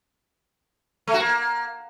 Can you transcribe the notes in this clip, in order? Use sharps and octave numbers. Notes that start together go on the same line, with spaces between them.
A3
F#4
A#3